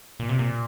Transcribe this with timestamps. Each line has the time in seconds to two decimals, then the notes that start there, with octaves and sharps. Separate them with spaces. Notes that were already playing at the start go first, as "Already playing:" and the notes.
0.20 A#2
0.29 C3
0.39 A#2